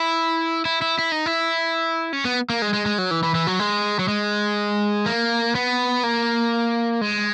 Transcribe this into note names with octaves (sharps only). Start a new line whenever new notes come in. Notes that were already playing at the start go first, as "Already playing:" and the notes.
Already playing: E4
E4
E4
E4
D#4
E4
C#4
B3
A#3
G#3
G#3
G#3
F#3
E3
E3
E3
F#3
G#3
F#3
G#3
A#3
B3
A#3
G#3